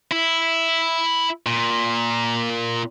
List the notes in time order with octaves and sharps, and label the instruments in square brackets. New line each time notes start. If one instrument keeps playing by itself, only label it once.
[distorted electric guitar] E4
A#2